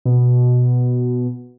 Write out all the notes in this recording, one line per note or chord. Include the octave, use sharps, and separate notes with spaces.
B2